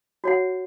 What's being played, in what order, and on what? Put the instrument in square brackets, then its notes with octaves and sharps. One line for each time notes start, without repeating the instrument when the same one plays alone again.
[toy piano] F#4 C#5 F#5